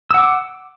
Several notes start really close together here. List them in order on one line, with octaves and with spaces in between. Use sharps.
E6 F#5 D6